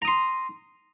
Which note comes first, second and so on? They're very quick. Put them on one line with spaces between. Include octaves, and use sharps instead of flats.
A#5 D#6 C6